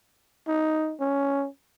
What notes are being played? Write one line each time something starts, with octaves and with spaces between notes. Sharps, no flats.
D#4
C#4